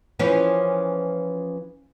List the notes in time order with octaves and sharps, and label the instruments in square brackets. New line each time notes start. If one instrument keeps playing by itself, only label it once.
[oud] E3 F3 C#4